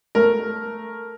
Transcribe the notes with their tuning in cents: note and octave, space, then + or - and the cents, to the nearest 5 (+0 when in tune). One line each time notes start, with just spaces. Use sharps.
A3 +0 A#4 +0